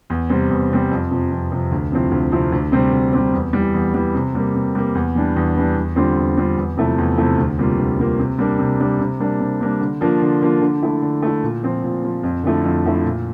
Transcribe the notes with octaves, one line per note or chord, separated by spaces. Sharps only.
E2
C3 G3 C4
E2
C3 G3 C4
F2
C3 F3
F2
C3 F3
D2
C3 F3 C4 E4
D2
C3 F3 C4 E4
D2
C3 G3 C4
D2
C3 G3 C4
E2
E3 G3
E2
E3 G3
C3
G3 A#3
C3
G3 A#3
E2
E3 G3 D4
E2
E3 G3 D4
E2
D3 G3 C4 F4
E2
D3 G3 C4 F4
E2
C3 F3 A3 E4
E2
C3 F3 A3 E4
D2
C3 G3 A#3 F4
D2
C3 G3 A#3 F4
C3
G3 A#3 D4
C3
G3 A#3 D4
C3
G3 A#3 D4
C3
G3 A#3 D4
D3
F3 A#3 D4 F4
D3
F3 A#3 D4 F4
D3
A3 E4
D3
A3 E4
A#2
F3 C4
A#2
F3 C4
F2
D3 F3 A3 E4
F2
D3 F3 A3 E4
A#2